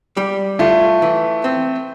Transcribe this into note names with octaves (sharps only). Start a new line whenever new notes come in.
G3
A3 F4
E3
C4